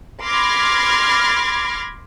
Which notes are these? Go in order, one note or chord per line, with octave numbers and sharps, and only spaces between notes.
B5 C6 D6 F6 G#6 A#6